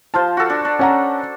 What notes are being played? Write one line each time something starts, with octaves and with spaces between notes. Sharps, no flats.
F3 F4 C5 A5
F#4 A4
D4
D4
C#4 F#5 A#5